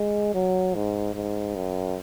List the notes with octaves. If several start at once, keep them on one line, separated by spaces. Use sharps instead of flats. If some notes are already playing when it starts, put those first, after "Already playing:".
Already playing: G#3
F#3
G#2
G#2
F#2